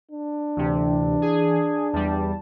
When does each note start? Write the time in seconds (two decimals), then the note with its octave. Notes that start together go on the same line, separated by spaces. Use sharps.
0.12 D4
0.56 D2 C3 E3
1.22 G#4
1.93 E2 G3 A5